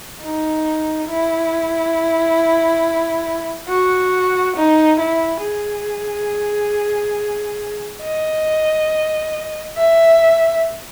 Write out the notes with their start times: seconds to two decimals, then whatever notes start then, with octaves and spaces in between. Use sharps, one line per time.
0.22 D#4
1.09 E4
3.70 F#4
4.56 D#4
4.99 E4
5.43 G#4
8.03 D#5
9.77 E5